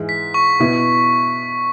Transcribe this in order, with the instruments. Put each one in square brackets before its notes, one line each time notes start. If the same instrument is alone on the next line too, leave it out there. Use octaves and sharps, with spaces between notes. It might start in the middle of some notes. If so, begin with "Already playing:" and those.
Already playing: [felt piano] G#2 E3 G#3
[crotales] B6
C#6
[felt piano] B2 B3 E4